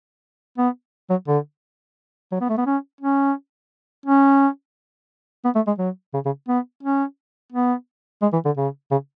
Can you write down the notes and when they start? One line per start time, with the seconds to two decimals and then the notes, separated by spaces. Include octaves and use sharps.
0.59 B3
1.10 F#3
1.28 D3
2.32 F#3
2.41 B3
2.49 A3
2.58 B3
2.67 C#4
3.01 C#4
4.06 C#4
5.45 B3
5.56 A3
5.67 G#3
5.79 F#3
6.14 C#3
6.26 C#3
6.49 B3
6.83 C#4
7.53 B3
8.22 G#3
8.33 E3
8.46 D3
8.57 C#3
8.91 C#3